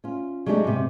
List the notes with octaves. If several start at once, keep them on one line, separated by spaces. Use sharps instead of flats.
C#4 F4
F#3 G#3 A3 D4 F4 G4
G#2 C3